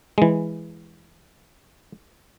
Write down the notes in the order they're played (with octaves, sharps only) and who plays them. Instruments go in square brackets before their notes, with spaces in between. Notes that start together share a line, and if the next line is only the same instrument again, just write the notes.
[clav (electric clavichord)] E3 G#3